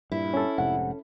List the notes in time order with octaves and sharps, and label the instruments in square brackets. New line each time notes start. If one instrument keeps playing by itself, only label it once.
[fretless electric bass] G2 A#2 [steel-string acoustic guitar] E4
[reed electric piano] C#4 A4
[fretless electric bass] F1 G#2 C3 [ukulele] F#5